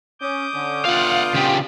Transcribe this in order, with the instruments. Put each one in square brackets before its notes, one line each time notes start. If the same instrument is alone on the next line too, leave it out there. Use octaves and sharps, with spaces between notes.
[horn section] C#4 [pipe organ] D6 D#6 G6
[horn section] D3 C#4
[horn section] D3 B3 F4 [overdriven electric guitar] F5 F#5
[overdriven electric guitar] C#3 G4